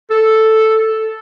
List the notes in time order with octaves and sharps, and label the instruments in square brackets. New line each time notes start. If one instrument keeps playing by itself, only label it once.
[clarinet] A4